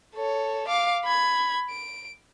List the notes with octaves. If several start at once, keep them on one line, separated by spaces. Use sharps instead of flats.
A4 C#5
F5 D6
B5 G#6
D7